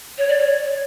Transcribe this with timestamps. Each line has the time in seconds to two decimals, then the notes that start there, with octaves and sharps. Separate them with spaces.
0.18 C#5
0.28 D5
0.40 C#5
0.64 C#5